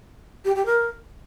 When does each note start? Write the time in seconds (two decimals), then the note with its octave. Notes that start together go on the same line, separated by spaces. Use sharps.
0.45 G4
0.55 G4
0.66 A#4